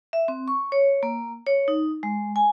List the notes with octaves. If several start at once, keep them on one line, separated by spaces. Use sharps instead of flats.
E5
C4
C#6
C#5
A#3
C#5
D#4
G#3
G#5